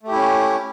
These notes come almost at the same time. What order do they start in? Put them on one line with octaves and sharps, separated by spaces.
A3 G4 E4 C#4